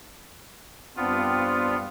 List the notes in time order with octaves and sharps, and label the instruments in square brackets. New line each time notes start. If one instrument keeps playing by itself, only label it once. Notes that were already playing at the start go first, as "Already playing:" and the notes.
[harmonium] G2 C4 D4 [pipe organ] B3 F4